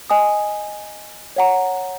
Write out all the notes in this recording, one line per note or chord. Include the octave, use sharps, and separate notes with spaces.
D#5 G#5 D#6
C#5 F#5 A#5